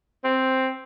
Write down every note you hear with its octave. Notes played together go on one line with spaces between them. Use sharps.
C4